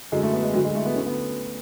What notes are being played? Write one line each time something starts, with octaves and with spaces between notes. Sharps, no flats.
F#2 D3 G#3
A3
B3
G#3
D2 D3 F#3
G#3
A3
B3
D2 D3 C#4
B3